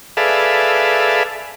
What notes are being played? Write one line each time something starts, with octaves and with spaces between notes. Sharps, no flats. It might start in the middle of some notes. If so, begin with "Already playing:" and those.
G#4 A4 B4 D5 E5 F5